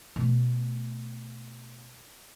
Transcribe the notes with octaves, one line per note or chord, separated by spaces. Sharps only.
B2 A3